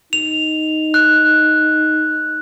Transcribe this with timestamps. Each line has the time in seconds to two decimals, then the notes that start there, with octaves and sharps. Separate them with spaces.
0.13 D#4 F7
0.94 F#6